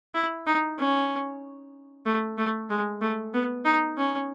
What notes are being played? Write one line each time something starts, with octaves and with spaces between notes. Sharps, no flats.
E4
D#4
C#4
A3
A3
G#3
A3
B3
D#4
C#4